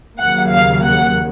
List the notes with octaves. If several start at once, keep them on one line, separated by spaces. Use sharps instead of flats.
D#2 C#3 F#3 A#3 F#5
F5
F#5